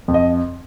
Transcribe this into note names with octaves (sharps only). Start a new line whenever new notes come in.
F2
D#5